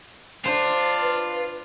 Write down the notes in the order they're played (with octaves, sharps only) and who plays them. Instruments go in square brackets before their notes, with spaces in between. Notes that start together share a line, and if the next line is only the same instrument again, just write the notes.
[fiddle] D4 [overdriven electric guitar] F4 [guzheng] C5
[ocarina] B4